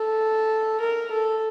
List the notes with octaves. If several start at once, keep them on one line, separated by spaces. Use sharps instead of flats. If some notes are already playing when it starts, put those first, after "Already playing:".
Already playing: A4
A#4
A4